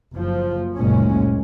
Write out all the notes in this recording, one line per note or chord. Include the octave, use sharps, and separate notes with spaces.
F#1 F3
F#1 D2 A#2 G#3 C#4